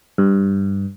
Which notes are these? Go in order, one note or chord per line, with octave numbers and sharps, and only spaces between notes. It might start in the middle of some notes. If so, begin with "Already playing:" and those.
G2